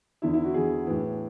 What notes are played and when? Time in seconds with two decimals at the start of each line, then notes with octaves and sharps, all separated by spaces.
0.22 E2 D3 E4
0.33 E4
0.44 F#4
0.54 E2 D3 G#4
0.87 A2 E3